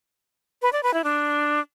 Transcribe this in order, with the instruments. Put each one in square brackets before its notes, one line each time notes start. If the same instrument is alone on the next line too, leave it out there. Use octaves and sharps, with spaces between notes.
[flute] B4
D5
B4
E4
D4